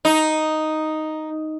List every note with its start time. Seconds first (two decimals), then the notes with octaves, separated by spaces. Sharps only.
0.05 D#4